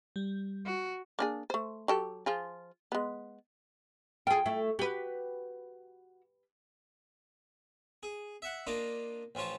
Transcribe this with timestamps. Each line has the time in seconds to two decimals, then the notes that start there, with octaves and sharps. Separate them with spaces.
0.16 G3
0.65 F#4
1.19 A#3 D4 G#4
1.50 A3 C5
1.88 F#3 G4 A4
2.26 F3 F4 G#4
2.92 G#3 B3
4.27 F4 G#4 G5
4.46 A3 E4
4.79 F#4 G4 B4
8.03 G#4
8.42 E5 F#5
8.67 A#3 D4 F4 D#5
9.35 A1 F3 C#4 F4 A5